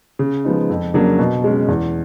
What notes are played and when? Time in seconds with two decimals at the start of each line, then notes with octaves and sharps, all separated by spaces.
0.19 C#3
0.45 F3 G#3 B3 D#4
0.70 F2
0.94 C#3 F#3 A#3 D4
1.19 B2
1.44 G#3 C#4
1.68 E2